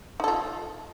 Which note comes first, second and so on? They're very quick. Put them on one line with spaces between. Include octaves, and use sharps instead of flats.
D#4 A4 F4